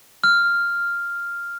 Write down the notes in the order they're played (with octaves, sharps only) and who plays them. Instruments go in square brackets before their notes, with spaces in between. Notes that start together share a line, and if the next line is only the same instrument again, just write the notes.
[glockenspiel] F6